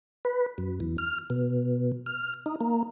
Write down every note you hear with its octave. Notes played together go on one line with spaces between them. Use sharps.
B4
F#2
E2
F6
B2
F6
D#4
A#3